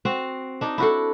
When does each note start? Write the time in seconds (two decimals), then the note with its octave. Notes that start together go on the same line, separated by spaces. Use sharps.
0.05 C4 F#4
0.61 D4 D#4
0.78 E4 F#4 A4